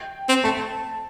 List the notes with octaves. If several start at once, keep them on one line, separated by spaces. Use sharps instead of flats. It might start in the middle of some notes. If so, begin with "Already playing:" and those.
Already playing: G5
C4
A3 A5